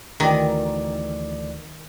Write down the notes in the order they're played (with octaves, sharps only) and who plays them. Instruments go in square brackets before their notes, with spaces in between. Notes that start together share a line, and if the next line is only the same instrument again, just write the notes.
[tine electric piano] D2 E3 D5 [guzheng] D#3